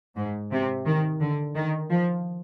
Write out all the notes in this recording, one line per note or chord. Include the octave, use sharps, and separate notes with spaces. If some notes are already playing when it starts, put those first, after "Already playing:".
G#2
C3
D#3
D3
D#3
F3